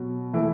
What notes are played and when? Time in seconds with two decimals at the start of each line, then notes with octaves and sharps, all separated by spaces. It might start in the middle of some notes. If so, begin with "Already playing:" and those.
Already playing: B2 F#3
0.33 E3 A3